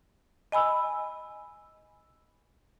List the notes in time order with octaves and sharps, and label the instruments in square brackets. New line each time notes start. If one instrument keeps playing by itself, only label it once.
[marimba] D#5 G#5 B5 E6